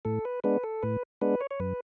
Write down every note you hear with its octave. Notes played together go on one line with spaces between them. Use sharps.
A2 A4
B4
G#3 B3 D4 B4
A4
A2 B4
G#3 B3 D4 B4
C#5
C#5
F#2 B4